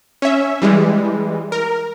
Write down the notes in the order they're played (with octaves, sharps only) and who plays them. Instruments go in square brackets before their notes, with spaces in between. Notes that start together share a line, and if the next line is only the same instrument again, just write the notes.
[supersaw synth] C#4 E5
E3 G3 G#3
A#4